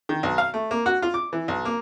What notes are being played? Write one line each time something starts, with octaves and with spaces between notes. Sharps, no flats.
D#3
B1
F5
A3
A#3
F#4
F4
D6
E3
B1
A#3